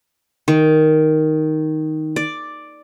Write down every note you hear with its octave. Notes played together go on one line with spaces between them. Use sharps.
D#3
D5